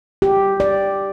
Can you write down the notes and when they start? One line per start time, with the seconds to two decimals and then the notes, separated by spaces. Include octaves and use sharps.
0.22 G4
0.60 D5